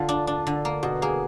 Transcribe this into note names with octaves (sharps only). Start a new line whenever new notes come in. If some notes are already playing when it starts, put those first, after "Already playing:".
Already playing: D3 F4
D4
D4
D3
A#3
B2 F#4
A#3 G#4